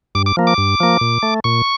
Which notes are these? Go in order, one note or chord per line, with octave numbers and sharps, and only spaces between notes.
G2 D6
D6
F3 A#3
D6
G2
F3 A#3
A#2
A3
A#2 C#6